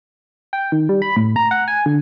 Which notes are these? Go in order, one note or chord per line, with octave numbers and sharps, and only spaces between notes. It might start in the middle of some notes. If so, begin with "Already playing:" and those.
G5
D#3
G3
B5
A2
A#5
F#5
G#5
D3